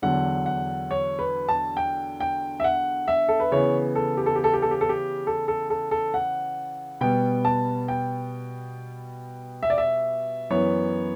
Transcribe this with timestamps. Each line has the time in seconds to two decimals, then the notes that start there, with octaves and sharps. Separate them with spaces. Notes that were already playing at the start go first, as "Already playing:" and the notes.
0.02 E2 D3 F#3 F#5
0.46 F#5
0.91 C#5
1.19 B4
1.49 A5
1.77 G5
2.20 G5
2.60 E5
2.64 F#5
3.08 E5
3.29 A4
3.40 B4
3.52 C#3 E3 B3 C#5
3.95 A4
4.17 G4
4.26 A4
4.36 G4
4.44 A4
4.53 G4
4.62 A4
4.71 G4
4.81 A4
4.89 G4
5.27 A4
5.48 A4
5.70 A4
5.91 A4
6.14 F#5
7.01 B2 G3 B3 G5
7.45 A5
7.88 G5
9.63 E5
9.70 D5
9.78 E5
10.50 F#2 E3 B3 C#5